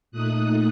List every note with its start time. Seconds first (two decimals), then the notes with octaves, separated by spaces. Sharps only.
0.11 A#2 A3 D#4 D#6 F#6